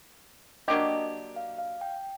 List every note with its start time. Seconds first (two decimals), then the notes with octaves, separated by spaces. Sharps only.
0.68 F#3 A#3 D4 G4 D#5
1.36 F5
1.58 F5
1.81 G5